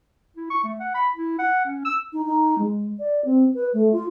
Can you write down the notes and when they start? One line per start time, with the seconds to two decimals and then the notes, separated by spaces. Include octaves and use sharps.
0.36 E4
0.50 C#6
0.64 A3
0.80 F#5
0.94 B5
1.16 E4
1.39 F#5
1.65 C#4
1.85 E6
2.13 D#4
2.25 D#4
2.58 G#3
3.00 D5
3.25 C4
3.54 B4
3.74 A3
3.92 F4